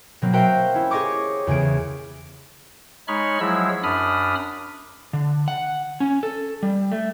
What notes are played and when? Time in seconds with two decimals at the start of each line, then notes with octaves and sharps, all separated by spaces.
0.22 B2 F#3 A#3 C4
0.33 F#4 A#4 C5 E5 F5 G5
0.74 C#4 E4
0.91 G4 G#4 C#5 D#5 C#6 D6
1.47 E2 C#3 G#4 D7
3.08 G#3 D#4 C#5 B5 C#6 F6
3.40 F3 F#3 G#3 E4 G#4 E6
3.83 F#2 D4 B5 D#6 F6
5.13 D3
5.48 F#5
6.00 C#4
6.23 A4
6.63 G3
6.92 A3